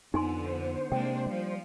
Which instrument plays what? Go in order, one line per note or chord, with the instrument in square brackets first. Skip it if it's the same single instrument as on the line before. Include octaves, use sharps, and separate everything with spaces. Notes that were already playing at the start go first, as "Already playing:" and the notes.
[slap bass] F2 [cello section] D3 B3 [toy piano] D#4 G#5 C6
[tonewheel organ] C5
[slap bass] C3 [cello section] G#3 A#3 D4 [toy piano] G5
[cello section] F3 [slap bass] G3